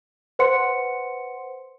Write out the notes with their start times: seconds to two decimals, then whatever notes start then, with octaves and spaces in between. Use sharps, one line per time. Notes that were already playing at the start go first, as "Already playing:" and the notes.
0.39 B4 C5 F#5 C6 C#7